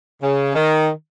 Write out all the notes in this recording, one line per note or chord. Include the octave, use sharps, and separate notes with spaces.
C#3
D#3